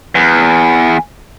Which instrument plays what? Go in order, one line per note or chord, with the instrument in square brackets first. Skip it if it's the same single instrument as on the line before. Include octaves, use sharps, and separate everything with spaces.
[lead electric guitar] E2